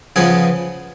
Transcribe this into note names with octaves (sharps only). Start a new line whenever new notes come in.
C#3 F3 B3 G#4 B4